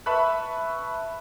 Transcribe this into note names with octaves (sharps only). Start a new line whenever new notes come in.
B4 E5 A5 B5 C#6 F#6